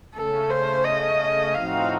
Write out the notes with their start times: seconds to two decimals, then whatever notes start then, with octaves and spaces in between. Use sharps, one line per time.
0.15 C#3 A3 C#4 A4
0.50 C5
0.85 D#5
1.54 A2 F3 C4 D#4 F#4 F5